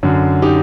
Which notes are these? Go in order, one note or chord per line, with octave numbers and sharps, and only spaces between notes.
F#2 D3
D#4 G4